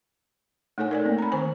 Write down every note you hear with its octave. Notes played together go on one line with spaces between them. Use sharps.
A3 D#4 A4 C#5 G#5
A#4 D5 G#5
A#3 C4
A#5 B5
D#3 C5 G#5